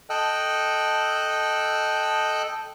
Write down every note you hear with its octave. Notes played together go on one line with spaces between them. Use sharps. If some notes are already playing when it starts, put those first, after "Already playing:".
A4 D#5 G5 E6 F#6